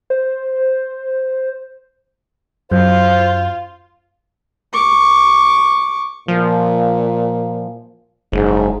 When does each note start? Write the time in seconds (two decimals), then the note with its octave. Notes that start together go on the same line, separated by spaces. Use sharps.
0.10 C5
2.72 F#2 F4 C5
4.73 C#6 D6
6.28 A#2 F3
8.33 F#1 G#2